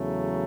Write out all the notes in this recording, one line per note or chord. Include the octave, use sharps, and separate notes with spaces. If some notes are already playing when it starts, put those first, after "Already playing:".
Already playing: E2 C#3 F#3 A3